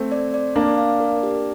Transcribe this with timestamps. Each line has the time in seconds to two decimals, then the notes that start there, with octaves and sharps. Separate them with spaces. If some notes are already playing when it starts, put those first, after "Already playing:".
Already playing: A3 C4
0.12 D5
0.34 D5
0.56 A#3 D4 F5
0.78 F5
1.00 A#4
1.23 G4